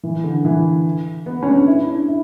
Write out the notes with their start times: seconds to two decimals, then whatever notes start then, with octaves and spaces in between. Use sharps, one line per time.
0.03 E3
0.24 D3
0.45 E3
1.26 B3
1.43 C#4
1.46 D4
1.67 E4
1.87 D4
2.08 E4